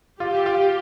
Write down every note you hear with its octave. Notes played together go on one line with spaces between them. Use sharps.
F4 G4
F4